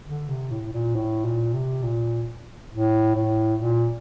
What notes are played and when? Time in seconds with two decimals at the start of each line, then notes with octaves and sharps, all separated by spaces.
0.07 D3
0.29 C3
0.51 A2
0.73 A#2
0.95 A2
1.25 A#2
1.54 C3
1.83 A#2
2.72 A2
3.15 A2
3.60 A#2